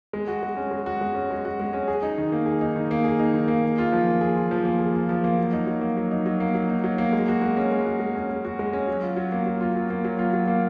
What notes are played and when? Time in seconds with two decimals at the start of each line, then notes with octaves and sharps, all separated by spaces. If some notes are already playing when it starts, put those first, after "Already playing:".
0.13 G#3
0.28 F#4
0.43 G#3
0.57 C#4
0.71 G#3
0.86 F#4
1.01 G#3
1.15 C#4
1.31 G#3
1.45 F#4
1.60 G#3
1.73 C#4
1.88 G#4
2.03 D#4
2.18 D#3
2.32 A#3
2.46 G#4
2.61 D#4
2.76 D#3
2.91 A#3
3.04 G#4
3.19 D#4
3.33 D#3
3.48 A#3
3.64 G#4
3.78 F4
3.92 F3
4.07 A#3
4.21 G#4
4.36 F4
4.51 F3
4.65 A#3
4.79 G#4
4.94 F4
5.09 F3
5.24 A#3
5.39 F#3
5.53 D#4
5.67 F#3
5.81 A#3
5.97 F#3
6.11 D#4
6.26 F#3
6.40 A#3
6.54 F#3
6.70 D#4
6.84 F#3
6.98 A#3
7.13 G#3
7.28 F#4
7.41 G#3
7.57 C#4
7.72 G#3
7.86 F#4
8.00 G#3
8.15 C#4
8.29 G#3
8.45 F#4
8.59 G#3
8.73 C#4
8.87 F#3
9.02 F4
9.16 F#3
9.32 A#3
9.46 F#3
9.61 F4
9.75 F#3
9.90 A#3
10.04 F#3
10.19 F4
10.33 F#3
10.48 A#3